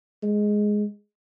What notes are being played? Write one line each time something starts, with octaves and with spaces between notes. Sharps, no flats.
G#3